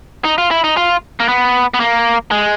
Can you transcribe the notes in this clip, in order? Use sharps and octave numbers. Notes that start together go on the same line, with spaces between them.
D#4
F4
E4
D#4
F4
A#3
B3
B3
A#3
G#3